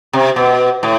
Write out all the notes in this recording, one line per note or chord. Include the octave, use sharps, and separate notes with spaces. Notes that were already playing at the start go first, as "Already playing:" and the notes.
C3
B2
A2